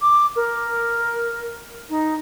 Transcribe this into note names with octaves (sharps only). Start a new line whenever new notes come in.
D6
A#4
D#4